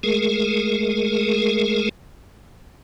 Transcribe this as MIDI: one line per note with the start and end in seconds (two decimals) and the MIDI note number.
0.03 1.89 56
0.03 1.89 57
0.03 1.89 68
0.03 1.89 70